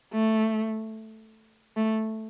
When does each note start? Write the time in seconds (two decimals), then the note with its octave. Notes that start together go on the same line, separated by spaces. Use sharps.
0.13 A3
1.76 A3